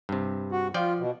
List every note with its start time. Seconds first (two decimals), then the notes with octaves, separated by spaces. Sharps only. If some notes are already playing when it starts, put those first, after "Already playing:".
0.09 G2 C3
0.52 F#4
0.74 F3 F4 D5 G5
0.99 B2